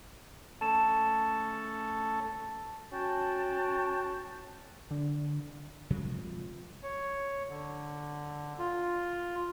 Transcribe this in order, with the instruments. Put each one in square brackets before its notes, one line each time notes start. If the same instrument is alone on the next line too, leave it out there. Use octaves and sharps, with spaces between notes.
[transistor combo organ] A3 C#4 A4 [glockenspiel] A5 E7
[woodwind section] C#4 F#4 G5 A5
[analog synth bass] D3
[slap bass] C3 F3 G#3 A3
[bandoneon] C#5
D3
F4